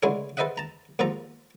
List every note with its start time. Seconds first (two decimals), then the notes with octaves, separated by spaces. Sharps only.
0.03 C#2 D3 G#3 A3 E4 C#5
0.37 A4 B4 C5 D#5 E5 F#5
0.58 A5 A#5
0.99 D#2 G#2 F3 A4 A#5